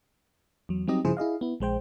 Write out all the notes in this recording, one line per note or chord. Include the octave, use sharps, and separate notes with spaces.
E2 F#3
F#3 G3 C4 D#4 G4 D#5
G2 C#3 F3 E4 G#4 C5
E4 G#4 D#5 F5
B3 E4
A#1 G#3 C5 G5